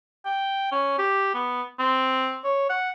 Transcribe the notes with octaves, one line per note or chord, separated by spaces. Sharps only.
G5
C#4
G4
B3
C4
C#5
F#5